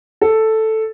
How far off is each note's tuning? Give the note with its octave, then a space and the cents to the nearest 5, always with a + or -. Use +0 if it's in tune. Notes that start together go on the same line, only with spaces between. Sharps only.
A4 +0